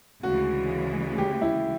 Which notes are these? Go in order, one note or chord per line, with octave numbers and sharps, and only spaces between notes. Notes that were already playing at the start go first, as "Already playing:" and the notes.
D2 C#3 E3 G#3 F#4
G4
E4